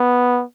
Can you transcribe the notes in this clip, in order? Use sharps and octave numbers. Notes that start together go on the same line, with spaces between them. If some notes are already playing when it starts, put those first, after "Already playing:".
Already playing: B3